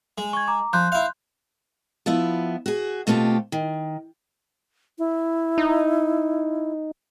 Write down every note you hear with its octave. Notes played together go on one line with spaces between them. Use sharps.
G#3
C#6 G#6
A#5 D6
F3 C6 F#6 G6
E4 F5
F3 B3 E4 E5
F#4 G#4
B2 A3 C4 F4 G4
D#3
E4
D#4